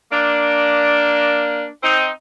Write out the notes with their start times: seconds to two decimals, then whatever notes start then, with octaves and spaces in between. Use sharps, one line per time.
0.12 A#3 D4
1.83 C4 D#4